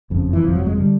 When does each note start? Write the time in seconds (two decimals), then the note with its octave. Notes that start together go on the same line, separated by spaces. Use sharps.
0.10 F#1 F2 C#3
0.33 E3
0.43 G1 F2 C3 F3
0.55 F#3
0.66 G#3
0.77 D3 G3